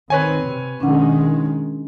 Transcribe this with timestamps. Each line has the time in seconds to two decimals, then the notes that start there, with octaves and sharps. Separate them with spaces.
0.10 D#3 C4 B4 C#5 G#5
0.41 C3
0.80 B2 D#3 G#3 C#4 D4 F#5